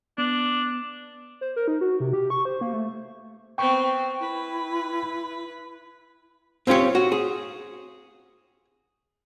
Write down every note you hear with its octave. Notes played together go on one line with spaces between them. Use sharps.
B3 D4
C5
A#4
D#4
F#4
C3
G4
C#6
C5
A#3
A3
B3 C4 G5 C#6
E4 B4
C4 C#4 F4 G4 C#5
F#4
G#4